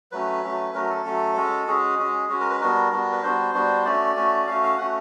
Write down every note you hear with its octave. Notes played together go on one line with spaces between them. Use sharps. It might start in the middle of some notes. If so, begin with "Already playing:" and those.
F#3 A3 C#4 B4
F#3 A3 C#4
F#3 A3 C#4 A#4
A4
F#3 A3 C#4
G#3 C#4 F#4
G#3 C#4 F#4 G#4
G#3 C#4 F#4
G#3 C#4 F#4
A#4
B4
G3 B3 D4 F#4 A#4
G3 B3 D4 F#4
B4
G3 B3 D4 F#4 C5
G3 B3 D4 F#4
A3 C#4 F#4 D5
A3 C#4 F#4
A3 C#4 F#4 F5
F5
A3 C#4 F#4 F#5